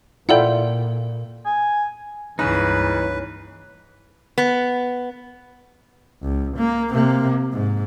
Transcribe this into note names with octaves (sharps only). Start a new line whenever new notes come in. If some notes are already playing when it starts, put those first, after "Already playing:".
A#2 E4 F4 A4 D5 F#5 G5
G#5
C#2 G2 C#3 E3 A#3 D#4 B4
B3
C#2
A#3
C3 A#3
G#2